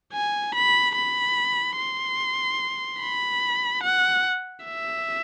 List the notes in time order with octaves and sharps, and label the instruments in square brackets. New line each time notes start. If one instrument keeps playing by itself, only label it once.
[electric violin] G#5
B5
B5
C6
B5
F#5
E5